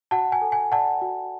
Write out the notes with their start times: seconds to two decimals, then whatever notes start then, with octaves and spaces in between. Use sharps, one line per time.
0.11 F#4 F#5 A5
0.32 G#5
0.42 A4
0.52 G#5
0.72 D5 F#5 A5
1.02 F#4